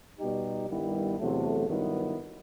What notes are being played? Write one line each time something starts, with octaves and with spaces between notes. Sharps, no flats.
B2 G3 D#4 G4
G2 D#3 G3 B3 E4
E2 C3 F#3 A3
G2 D#3 F#3 B3 E4